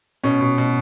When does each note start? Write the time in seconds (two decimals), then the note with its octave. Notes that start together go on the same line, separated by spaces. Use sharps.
0.23 B2 C#4
0.41 B2
0.58 B2